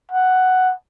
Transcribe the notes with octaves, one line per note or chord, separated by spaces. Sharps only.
F#5